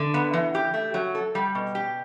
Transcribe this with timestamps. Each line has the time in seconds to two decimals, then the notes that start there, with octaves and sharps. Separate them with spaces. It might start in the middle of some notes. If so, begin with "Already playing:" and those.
Already playing: D3
0.14 B3
0.34 E3
0.55 G4
0.74 A3
0.94 F#3
1.15 A4
1.35 G3
1.55 B2
1.75 G4